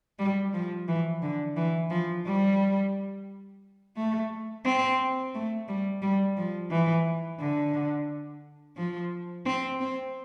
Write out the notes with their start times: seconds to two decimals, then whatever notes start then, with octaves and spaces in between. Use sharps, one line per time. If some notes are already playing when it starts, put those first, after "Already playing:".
0.19 G3
0.54 F3
0.88 E3
1.22 D3
1.57 E3
1.90 F3
2.26 G3
3.96 A3
4.65 C4
5.35 A3
5.68 G3
6.02 G3
6.37 F3
6.71 E3
7.40 D3
8.77 F3
9.46 C4
9.80 C4